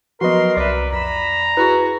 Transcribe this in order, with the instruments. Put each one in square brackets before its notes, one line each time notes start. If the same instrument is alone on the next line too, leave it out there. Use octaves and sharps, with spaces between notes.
[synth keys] F3 F#3 B3 [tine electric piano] F#4 B4 D#5 [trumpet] A#4 [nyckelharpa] C6
[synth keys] C2 E5 [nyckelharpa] B4 [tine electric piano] D5
[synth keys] F2 E7 [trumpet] A#5 [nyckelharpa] B5
[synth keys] E4 G#4 [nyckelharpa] F#4 [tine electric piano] B4